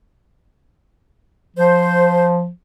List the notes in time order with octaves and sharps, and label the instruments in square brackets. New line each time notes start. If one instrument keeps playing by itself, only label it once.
[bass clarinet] F3 [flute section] C5